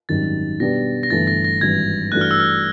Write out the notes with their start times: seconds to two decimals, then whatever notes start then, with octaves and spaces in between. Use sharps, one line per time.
0.09 G#1 F#2 D#3 G3 A6
0.60 B2 G3 B3 D4 G4 A#6
1.03 A#6
1.10 G1 G2 E3 A3 A6
1.27 A#6
1.45 A#6
1.61 G#1 G2 E3 G#6
2.12 G2 E3 A3 D4 F#4 F#6
2.21 F6
2.31 E6
2.40 F6